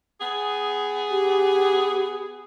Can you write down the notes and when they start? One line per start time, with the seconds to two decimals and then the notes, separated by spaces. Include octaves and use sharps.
0.21 B3 G#4
1.11 G4